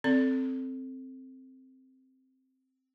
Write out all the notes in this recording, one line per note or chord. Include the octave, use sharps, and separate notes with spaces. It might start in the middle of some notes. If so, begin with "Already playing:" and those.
C4 A4 D5